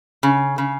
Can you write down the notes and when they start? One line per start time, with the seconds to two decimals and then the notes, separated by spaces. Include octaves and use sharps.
0.23 C#3
0.58 C#3